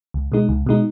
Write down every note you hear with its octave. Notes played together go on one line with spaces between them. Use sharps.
C#2
B2 G#3 D#4
C#2
B2 G#3 D#4